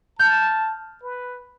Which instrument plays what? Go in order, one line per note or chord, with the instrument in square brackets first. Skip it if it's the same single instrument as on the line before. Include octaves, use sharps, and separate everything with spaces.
[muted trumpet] A5 [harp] F6 G6
[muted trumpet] B4